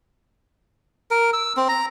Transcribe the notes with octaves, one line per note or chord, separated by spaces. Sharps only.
A#4
E6
C4
A#5